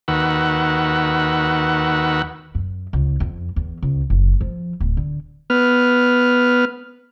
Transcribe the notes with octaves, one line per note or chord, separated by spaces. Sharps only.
D#2 D#3 F#4 B4 F#5 E6
F#2
C#2
F2
E2
C#2
F#1
F3
D1
D3
B3 F6